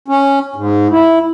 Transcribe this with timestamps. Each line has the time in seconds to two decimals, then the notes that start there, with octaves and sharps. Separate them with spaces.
0.08 C#4
0.56 G#2
0.91 E4